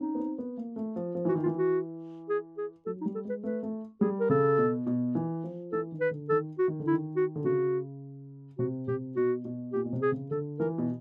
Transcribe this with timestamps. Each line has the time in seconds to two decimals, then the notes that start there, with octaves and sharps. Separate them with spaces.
0.01 C#4 D#4
0.15 B3
0.19 C4
0.38 B3
0.57 A#3
0.76 A3
0.96 F3
1.15 F3
1.25 E3 F#4
1.35 D#3
1.43 F4
1.46 E3
1.58 F#4
2.29 G#4
2.58 G#4
2.86 F#3 A4
3.01 D#4
3.06 G3
3.15 A4
3.25 G#3 B4
3.43 A3 B4
3.63 A3
4.01 G3 G#4
4.20 A#4
4.30 C#3 A4
4.58 B2
4.86 B2
5.15 E3
5.44 F3
5.72 E3 A4
5.92 D#3
6.01 B4
6.11 D3
6.29 D#3 A4
6.59 F#4
6.68 D#3
6.80 D3
6.87 E4
6.92 D#3
7.16 F#4
7.36 D3
7.44 C#3 F#4
8.59 C3 F#4
8.87 C3 G4
9.16 B2 F#4
9.45 B2
9.73 A#2 G4
9.85 B2
9.93 C3
10.02 G#4
10.12 C#3
10.31 D3 A4
10.59 E3 A#4
10.78 B2